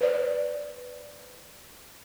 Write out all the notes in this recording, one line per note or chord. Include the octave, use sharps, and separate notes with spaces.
B4 C5 D5